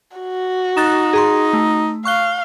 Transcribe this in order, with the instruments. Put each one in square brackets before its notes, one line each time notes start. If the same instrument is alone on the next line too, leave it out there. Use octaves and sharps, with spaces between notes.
[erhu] F#4
[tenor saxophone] D#4 [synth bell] F#6 A6 E7
[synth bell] G#4 A#5 C6
A3
[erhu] F5 [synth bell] C#6 F#6 G7